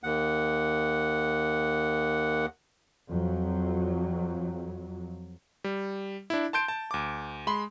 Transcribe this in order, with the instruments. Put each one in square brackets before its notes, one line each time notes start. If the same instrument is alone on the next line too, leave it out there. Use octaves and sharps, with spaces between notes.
[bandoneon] D#2 F#5
[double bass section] F2 F#3
[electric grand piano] G3
D4 E4
A5 C6 G6 D7
A5
D2 D6
G#3 B5 C6